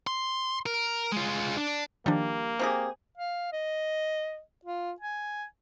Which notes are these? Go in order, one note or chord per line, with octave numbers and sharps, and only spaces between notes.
C6
A#4
G#3 F4
D4
D#3 F3 G3 A#3 D4
C4 G4 G#4
F5
D#5
F4
G#5